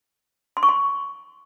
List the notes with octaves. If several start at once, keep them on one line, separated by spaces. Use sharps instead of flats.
C6
C#6
C6